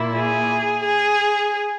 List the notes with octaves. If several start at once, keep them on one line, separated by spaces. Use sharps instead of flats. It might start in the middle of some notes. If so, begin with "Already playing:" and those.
Already playing: A#2 A#3 E4
G#4
G#4